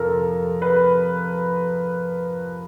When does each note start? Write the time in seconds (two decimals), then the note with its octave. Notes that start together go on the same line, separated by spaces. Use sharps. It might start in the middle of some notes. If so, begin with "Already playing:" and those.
Already playing: F2 C3 F3 A4 A#4
0.62 B4